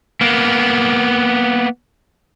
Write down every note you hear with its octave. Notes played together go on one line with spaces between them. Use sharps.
A#3 B3